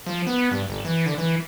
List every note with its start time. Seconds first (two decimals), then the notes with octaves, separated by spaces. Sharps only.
0.06 F3
0.27 B3
0.51 G2
0.68 G1
0.85 E3
1.06 D3
1.18 E3